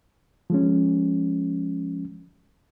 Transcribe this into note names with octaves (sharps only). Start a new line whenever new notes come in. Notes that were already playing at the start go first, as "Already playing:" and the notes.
F3 G#3 C#4